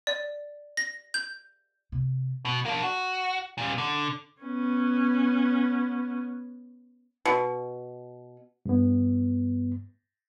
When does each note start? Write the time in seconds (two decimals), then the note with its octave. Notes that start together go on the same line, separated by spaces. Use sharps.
0.07 D5
0.77 A#6
1.14 G6
1.92 C3
2.45 B2
2.65 A#3 D4
2.83 F#4
3.58 A#2 G3
3.78 D3
4.42 B3 C#4
7.25 B2
8.65 G2 B3